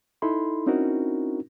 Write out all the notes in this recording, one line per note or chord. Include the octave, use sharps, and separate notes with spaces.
D#4 E4 A4 B5 C6
C4 C#4 D#4 E4 F#4 A#4